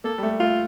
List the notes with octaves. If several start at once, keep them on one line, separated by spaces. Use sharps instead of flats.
A#3 A4
G3
A3
A3 F4